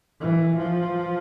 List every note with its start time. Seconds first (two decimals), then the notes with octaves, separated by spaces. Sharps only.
0.21 E3
0.58 F3